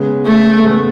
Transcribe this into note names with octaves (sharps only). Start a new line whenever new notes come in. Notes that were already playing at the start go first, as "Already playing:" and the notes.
Already playing: C#3 G#3 B3
A3
C#3 G#3 B3